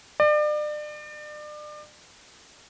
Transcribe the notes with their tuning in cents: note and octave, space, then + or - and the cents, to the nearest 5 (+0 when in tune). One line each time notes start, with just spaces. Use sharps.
D5 +35